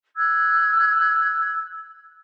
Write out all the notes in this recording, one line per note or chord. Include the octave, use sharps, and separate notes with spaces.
E6 F#6 G#6